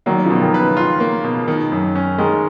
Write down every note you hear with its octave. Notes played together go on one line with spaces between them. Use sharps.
D#3 F#3 A#3
C#3 F3
B2
D#3
B4
C#3
F4
A#3
B2
D#3
F#2
C#4
D#3 G#3